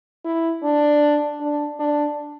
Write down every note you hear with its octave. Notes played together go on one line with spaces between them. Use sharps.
E4
D4
D4
D4